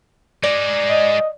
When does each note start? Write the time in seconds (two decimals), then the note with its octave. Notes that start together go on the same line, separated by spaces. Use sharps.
0.43 G#3 D#4 D5
0.90 D#5